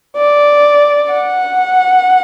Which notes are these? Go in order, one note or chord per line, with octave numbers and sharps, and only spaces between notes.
D5
F#5